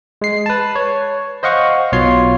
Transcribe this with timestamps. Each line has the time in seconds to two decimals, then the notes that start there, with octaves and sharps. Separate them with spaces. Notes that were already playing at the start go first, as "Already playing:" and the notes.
0.22 G#3 C7
0.46 B4 A5
0.76 C#5
1.43 C5 D#5 F5 F#5 C#6
1.92 B1 B2 F4 C#5 C6 C7